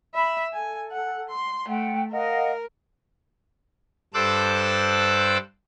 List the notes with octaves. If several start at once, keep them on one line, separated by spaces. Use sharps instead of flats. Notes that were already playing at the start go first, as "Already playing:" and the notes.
E5 B5
A4 G#5
F#5
C6
A3 F#5 G5
A#4 D#5 F5 F#5
G2 A4 C5 D6 E6 F#6